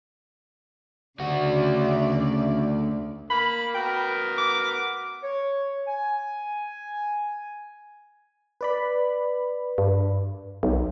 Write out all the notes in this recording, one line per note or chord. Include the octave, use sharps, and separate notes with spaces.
D2 C#3 F#4 D5
A#3 B5
B3 F#4 A#4 G5
D6
C#5
G#5
B4 D5 B5
G2
B1